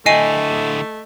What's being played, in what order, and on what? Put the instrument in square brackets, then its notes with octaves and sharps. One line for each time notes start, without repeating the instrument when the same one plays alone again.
[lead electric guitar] D3 E4 [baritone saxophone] A3 [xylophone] D#5 C7 D#7 [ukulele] G5 G#5